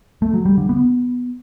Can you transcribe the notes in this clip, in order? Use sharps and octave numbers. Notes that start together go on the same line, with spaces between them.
A3
F#3
G3
D3
B3